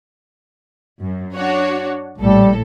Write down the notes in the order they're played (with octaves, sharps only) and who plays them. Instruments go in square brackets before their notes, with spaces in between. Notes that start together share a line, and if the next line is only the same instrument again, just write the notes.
[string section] F#2
D4 F#4 C#5
[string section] A#1 A2 A4 [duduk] G3